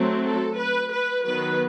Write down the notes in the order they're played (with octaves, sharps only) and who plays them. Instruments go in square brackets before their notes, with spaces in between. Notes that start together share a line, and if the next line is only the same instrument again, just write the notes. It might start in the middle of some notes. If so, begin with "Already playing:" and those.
Already playing: [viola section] F#3 A3 C4
A4
B4
B4
D#3 F#3 B3 B4